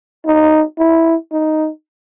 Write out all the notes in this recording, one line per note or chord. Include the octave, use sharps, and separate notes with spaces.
D#4
E4
D#4